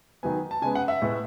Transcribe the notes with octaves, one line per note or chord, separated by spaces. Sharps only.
D#3 F#3 B3 G#5
A5
C#3 G#3 B3 G#5
F#5
E5
A2 G#3 B3